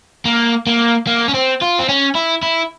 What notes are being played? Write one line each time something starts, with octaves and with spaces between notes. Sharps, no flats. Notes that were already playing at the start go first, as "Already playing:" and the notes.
A#3
A#3
A#3
C#4
C4
F4
C4
C#4
E4
E4